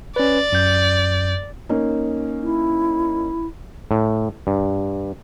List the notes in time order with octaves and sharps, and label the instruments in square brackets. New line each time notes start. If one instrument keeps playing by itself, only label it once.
[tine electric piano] C#4 B4 [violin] D5
[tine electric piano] F#2 G6
[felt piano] A#3 C#4 D#4
[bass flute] E4
[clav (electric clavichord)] A2
G2